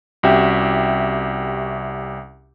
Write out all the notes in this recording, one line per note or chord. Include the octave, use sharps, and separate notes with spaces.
C2 C#4 F#4 G4 E5 G5